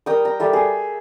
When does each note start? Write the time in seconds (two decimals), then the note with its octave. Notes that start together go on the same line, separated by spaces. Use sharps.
0.06 G3 A#4 G5 D#6
0.25 A#5
0.40 G3 A4 E5
0.53 G#4